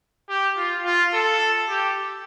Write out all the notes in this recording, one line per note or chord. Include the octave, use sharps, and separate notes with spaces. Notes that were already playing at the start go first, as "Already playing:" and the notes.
G4
F4
F4
A4
G4